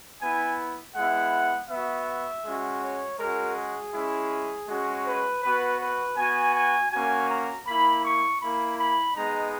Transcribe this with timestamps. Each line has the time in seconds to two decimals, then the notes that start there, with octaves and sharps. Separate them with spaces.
0.20 B3 E4 G#5
0.95 G#3 B3 E4 F#5
1.69 B3 F#4 E5
2.44 G#3 C#4 F#4
2.82 C#5
3.19 G#3 C#4 F#4 A#4
3.57 G#4
3.93 G#3 C#4 E4
4.68 G#3 C#4 F#4
5.06 B4
5.43 B3 F#4 B4
5.80 B4
6.17 B3 F#4 G#5
6.54 G#5
6.91 A#3 C#4 F#4 G#5
7.29 A#5
7.66 A#3 E4 B5
8.04 C#6
8.40 A#3 E4 B5
8.79 B5
9.15 G#3 B3 D#4 A#5